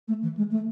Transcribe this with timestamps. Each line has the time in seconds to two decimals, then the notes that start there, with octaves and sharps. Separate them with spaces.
0.08 A3
0.23 E3
0.37 G#3
0.51 A3